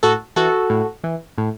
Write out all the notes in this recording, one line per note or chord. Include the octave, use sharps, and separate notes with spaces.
A2 F#4 A4
E3 F#4 A4
A2
E3
A2